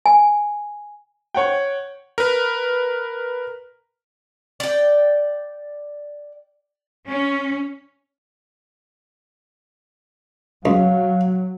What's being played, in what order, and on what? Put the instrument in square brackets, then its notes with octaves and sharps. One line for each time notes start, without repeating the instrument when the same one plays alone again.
[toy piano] G#5
[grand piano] C#5 F#5 G5
[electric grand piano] A#4 B4
[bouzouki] D5 G5
[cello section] C#4
[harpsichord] C#2 [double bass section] F#3 [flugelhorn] F5